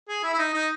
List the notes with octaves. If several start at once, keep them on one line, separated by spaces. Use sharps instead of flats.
G#4
E4
E4
D#4
D#4